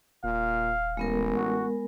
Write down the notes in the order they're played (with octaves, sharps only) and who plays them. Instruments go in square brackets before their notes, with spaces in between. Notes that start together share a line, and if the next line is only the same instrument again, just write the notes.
[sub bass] D#1 [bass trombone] A#2 [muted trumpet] F5
[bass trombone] A1 [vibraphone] G#3 B3 A#4
[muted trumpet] F#4